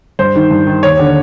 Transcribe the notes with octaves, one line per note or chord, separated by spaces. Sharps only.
G2 C5
D#3
G2
D#3
D#2 C#5
D3